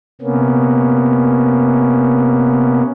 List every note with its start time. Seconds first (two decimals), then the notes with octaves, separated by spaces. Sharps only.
0.22 C3 A#3 B3 C#4